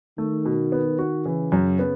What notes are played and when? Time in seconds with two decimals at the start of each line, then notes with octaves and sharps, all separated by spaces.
0.18 D#3 A3
0.45 B2
0.72 B3
0.99 F#4
1.25 C#3 E3
1.52 F#2
1.79 B3